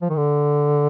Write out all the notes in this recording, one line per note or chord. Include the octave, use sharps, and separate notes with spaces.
F3
D#3
D3